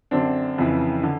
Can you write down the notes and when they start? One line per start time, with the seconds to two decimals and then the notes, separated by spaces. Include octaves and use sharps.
0.11 F#2 D3 C4 D4
0.58 F2 C#3 E3
1.03 D3